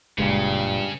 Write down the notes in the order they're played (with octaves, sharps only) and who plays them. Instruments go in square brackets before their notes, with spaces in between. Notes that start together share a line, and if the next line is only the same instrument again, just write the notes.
[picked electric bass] F#1 A#2 [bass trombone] G2 [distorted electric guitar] C#3 [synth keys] G#3